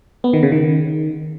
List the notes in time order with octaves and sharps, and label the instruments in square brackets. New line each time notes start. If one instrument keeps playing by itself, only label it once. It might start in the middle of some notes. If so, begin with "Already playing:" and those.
[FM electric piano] B3
D#3
C#3
D#3